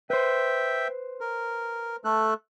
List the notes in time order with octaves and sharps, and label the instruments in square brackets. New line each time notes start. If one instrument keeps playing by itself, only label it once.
[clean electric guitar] B4 C5 [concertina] E5 G5
[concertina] A#4
A3 A4 F#6